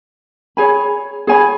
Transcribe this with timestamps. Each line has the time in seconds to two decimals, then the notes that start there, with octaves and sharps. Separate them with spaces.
0.57 G#4 C#5 G#5 B5
1.27 G#4 C#5 G#5 B5